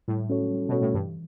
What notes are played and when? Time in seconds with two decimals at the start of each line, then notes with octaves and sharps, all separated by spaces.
0.08 A2 G3
0.30 C#4 F#4 A4 C#5
0.52 G3
0.69 B2 C#4 F#4 A4 C#5
0.81 A2
0.94 G2 E3